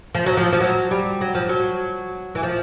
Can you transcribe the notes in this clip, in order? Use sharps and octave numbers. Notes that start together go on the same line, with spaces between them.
F3
F#3
F3
F3
F#3
G3
F#3
F3
F#3
E3
F3